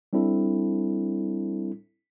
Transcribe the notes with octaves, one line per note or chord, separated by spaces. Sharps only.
G3 C4 D4 E4 A4